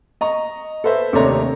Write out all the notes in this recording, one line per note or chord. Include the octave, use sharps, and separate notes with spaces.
D#5 A#5 C#6
A4 B4 C5 E5
D#2 C3 A3 D4 C#5 A#5